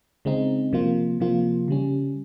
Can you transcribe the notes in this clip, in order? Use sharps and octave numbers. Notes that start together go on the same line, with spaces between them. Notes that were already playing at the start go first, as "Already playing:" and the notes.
C#3 G#3 C4 D#4
C3 F3 A#3 F4
C3 F3 A#3 F4
C#3 G3 C#4